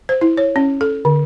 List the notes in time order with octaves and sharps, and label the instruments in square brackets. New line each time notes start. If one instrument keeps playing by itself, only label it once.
[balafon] C5
E4
C#5
C#4
A4
D3